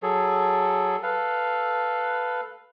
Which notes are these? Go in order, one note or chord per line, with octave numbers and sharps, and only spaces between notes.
F#3 G#4 A4
A4 B4 F5